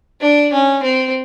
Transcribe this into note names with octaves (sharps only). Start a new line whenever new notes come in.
D4
C#4
C4